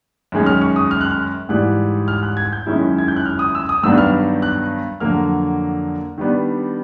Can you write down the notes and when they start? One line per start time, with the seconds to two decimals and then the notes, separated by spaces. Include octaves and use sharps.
0.32 F#2 D#3 G#3 C#4
0.46 F6
0.61 C#6
0.76 D#6
0.91 F6
1.01 F#6
1.11 F6
1.49 G#2 E3 G3 F#6
2.08 F6
2.23 F#6
2.37 G#6
2.53 G6
2.66 F#2 D#3 G#3 C#4 E4
2.99 G#6
3.08 G6
3.16 F#6
3.25 F6
3.39 D#6
3.55 E6
3.69 D#6
3.83 G2 D#3 F#3 B3 D4 E6
3.98 F6
4.42 F#6
5.00 F2 D3 F#3 A#3 F6
6.18 D#3 G3 B3 D4